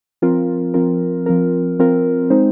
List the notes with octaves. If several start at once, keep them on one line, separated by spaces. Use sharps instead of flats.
F3 C4 F4 A#4
F3 C4 F4 A#4
F3 C4 F4 A#4
F3 C4 F4 A#4
G#3 C4 D#4 C5